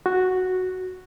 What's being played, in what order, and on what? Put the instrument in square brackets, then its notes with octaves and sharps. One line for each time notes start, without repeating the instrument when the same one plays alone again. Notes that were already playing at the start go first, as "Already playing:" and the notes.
[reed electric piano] F#4